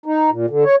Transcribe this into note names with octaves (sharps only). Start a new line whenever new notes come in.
D#4
A#2
D3
C#5